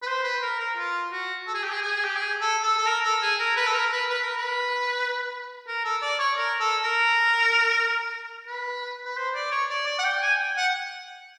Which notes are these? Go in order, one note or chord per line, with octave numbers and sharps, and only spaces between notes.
B4
C5
B4
A#4
A#4
F4
F#4
A4
G#4
G4
G#4
G#4
G4
G#4
A4
A4
A4
A#4
A4
G#4
A#4
B4
A4
A#4
B4
B4
A#4
B4
A#4
A4
D5
C#5
A#4
A4
A#4
B4
B4
C5
D5
C#5
D5
D5
F#5
G5
G#5
G5
F#5